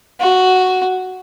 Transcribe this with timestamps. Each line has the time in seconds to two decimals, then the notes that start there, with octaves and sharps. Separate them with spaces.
0.20 F#4